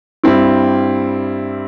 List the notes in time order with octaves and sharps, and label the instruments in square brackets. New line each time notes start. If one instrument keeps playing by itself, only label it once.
[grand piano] G2 G3 C4 E4